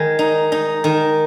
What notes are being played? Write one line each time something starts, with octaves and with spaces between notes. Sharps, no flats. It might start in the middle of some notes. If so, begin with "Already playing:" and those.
Already playing: D#3 G#3 G#4
D#4
D#4
D#3